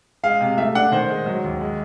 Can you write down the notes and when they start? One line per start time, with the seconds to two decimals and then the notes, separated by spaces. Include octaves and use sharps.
0.23 G#3 F5
0.41 C3
0.58 A3 E5
0.75 D4 F#5
0.92 D#3 C5
1.09 G#3
1.26 F#3
1.44 D#2
1.61 G#3